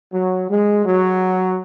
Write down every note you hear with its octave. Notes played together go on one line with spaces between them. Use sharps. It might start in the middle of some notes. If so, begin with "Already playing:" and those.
F#3
G#3
F#3